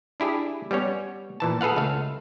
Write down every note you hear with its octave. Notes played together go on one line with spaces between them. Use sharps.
D4 E4 G4 G#4
G3 B3 C#4 C#5
A#2 E3 A5
G#4 A4 B4 F5 F#5
C#2 A3 F5